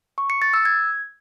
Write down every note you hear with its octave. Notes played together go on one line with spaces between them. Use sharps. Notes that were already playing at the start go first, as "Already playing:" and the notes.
C#6
C#7
A6
E6
G#6